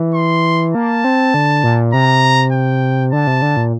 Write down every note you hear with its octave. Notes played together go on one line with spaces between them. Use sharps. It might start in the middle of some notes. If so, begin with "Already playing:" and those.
Already playing: E3
C6
A#3 A5
C4
D3
A#2
C3 A#5
G5
D3 A5
C3
D3
A#2